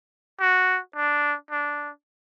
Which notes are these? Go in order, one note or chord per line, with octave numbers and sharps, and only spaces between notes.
F#4
D4
D4